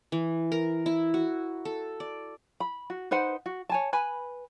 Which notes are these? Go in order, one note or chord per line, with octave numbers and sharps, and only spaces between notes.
E3
A#4
E4
F#4
A4
D5
B5
F#4
D#4 B4 C5 F#5
F#4
C#5 G#5 A5
B4 G#5 B5